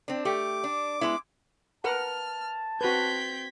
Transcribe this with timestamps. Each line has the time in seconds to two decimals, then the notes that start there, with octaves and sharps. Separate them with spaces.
0.08 C4 D4
0.25 A3 G4 D6
0.64 D4
1.01 G#3 B3 E4
1.84 A#4 B4 F#5 A5 F6
2.81 C4 F#4 B4 G6 G#6 B6